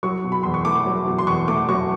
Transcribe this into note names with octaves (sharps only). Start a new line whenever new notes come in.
F#3 C#6
B2
B5
E2 C6
C#6
A3 D6
F#3
B2
C6
E2 C#6
A3 D6
F#3 C#6